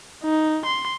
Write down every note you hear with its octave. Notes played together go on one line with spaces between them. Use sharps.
D#4
C6